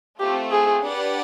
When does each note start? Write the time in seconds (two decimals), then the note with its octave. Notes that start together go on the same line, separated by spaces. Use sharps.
0.19 A3 C4 F4 G4
0.52 G#4
0.83 D4 G4 B4 D5 F#5